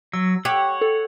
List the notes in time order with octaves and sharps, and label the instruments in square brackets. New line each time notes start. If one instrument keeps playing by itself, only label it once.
[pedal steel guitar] F#3 [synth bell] E6
[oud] G4 [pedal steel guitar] C#5 F#5
[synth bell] A4